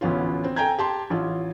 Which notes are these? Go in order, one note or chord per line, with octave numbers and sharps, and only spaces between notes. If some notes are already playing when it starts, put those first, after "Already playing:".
A1 D2 B3 C#4 F4
C4
A4 G5 G#5 A#5 G6 G#6
G4 A5 C6
A1 F4